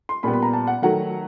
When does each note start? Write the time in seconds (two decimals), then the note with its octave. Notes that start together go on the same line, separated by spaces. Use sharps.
0.09 C6
0.23 A#2 G3 B3 B5
0.33 B5
0.43 A#5
0.53 A5
0.67 F#5
0.82 D#3 F#3 A3 F#5